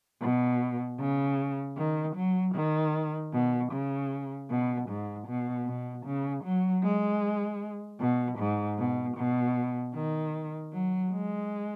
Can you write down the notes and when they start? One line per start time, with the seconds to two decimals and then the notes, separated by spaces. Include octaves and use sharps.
0.21 B2
0.99 C#3
1.77 D#3
2.16 F#3
2.55 D#3
3.33 B2
3.72 C#3
4.50 B2
4.89 G#2
5.28 B2
5.67 B2
6.05 C#3
6.44 F#3
6.83 G#3
8.00 B2
8.39 G#2
8.78 B2
9.17 B2
9.94 D#3
10.73 F#3
11.12 G#3